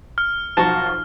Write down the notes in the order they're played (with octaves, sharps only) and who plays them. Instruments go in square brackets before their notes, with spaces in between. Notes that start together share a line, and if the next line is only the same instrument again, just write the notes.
[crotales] F6
[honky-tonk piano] B1 F3 [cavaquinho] F#4 A#4 A5